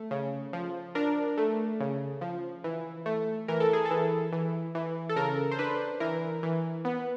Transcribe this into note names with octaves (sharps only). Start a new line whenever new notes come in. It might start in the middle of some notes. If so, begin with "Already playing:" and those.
Already playing: A3
C#3
F3
D4 A#4
A3
C#3
F3
E3
A3
E3 A#4
A4
G#4
A4
E3
E3
E3
A4
C#3 A#4
C5
D4 B4
E3 A#4
E3
B3